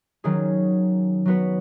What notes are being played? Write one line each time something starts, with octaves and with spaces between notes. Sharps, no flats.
D#3 F#3 C#4 G#4
F#3 B3 F#4 B4